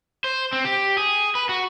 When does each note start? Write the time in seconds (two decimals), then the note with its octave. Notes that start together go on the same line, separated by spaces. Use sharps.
0.24 C5
0.53 C4
0.65 G4
0.97 G#4
1.35 B4
1.49 F#4